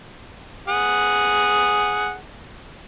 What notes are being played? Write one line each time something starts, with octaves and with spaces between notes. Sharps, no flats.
G#4 F#5